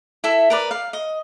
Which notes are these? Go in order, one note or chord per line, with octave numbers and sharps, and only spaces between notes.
E4 A4 E5
A#4 B4 D5
F5
D#5